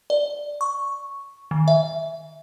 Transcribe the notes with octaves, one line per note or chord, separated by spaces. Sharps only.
D5
C#6
D#3
E5